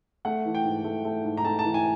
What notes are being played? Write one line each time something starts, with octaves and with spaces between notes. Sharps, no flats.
A3 F#5
E3
G5
G#2
A3
A3
G#2
A#5
A3 A5
A5
E3
G#5